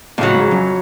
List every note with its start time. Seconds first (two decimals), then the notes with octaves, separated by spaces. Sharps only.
0.18 F2 A2 C#3 F#3
0.35 G#2
0.51 F#2